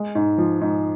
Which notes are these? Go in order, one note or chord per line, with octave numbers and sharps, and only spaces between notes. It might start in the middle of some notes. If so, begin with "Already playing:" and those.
Already playing: G#3
G#2
F3
G#2